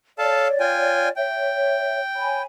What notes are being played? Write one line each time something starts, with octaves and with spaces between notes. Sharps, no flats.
A4 C#5 D5 F5 A5
F4 G5 G#5
C#5 E5 G5
C#5 G#5 B5